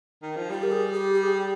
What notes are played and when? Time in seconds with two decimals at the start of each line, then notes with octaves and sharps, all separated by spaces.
0.22 D#3
0.36 F3
0.50 G3 G4
0.63 A#4
0.72 G#4
0.93 G4
1.13 G4
1.23 G#4
1.34 G4